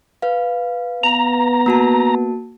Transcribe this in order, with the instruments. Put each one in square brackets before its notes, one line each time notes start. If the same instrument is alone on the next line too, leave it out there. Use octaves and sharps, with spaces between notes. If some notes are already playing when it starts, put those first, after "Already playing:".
[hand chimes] B4 F5
[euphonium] B3 [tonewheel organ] A#5
[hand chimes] A#3 F#4 A5